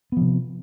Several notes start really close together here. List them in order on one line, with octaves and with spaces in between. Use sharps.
B3 F3 C3